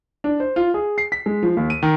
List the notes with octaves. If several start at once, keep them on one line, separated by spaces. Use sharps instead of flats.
D4
C5
F4
G#4
C7
B6
G#3
F3
D#2
D#7
D#3